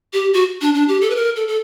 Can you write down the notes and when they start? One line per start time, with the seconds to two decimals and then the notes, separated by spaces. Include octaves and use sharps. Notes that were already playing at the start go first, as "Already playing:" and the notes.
0.13 G4
0.33 F#4
0.61 D4
0.74 D4
0.88 G4
1.01 A4
1.10 B4
1.16 A#4
1.36 A4
1.48 A4